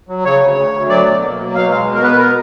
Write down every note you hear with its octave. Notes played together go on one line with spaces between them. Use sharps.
F#3
C#3 C#5
D2
D2
D2
F#3 D5
B2
A#3
F#3
B2 F5
G#3 F5
B2
A#4
B3 B4
A#4